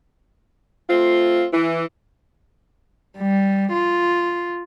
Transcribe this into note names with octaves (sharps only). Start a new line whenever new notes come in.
A3 C4 F4
E3
G3
F4